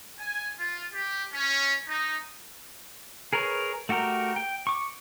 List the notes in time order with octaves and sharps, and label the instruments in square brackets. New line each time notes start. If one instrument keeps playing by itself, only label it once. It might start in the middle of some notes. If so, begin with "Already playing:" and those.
[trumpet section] G#5
F4
G4
C#4
D#4
[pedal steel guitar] G#4 A#4 B4 C#5
A3 F#4 G4 A#4
G5
C#6 D6